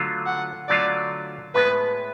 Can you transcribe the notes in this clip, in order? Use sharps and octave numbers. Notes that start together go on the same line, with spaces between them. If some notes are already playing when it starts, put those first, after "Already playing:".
Already playing: D3 F#3 A3 F4
F#5
D3 F#3 A3 F4 D5
A2 G#3 B3 B4